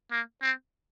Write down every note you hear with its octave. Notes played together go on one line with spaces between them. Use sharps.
A#3
C4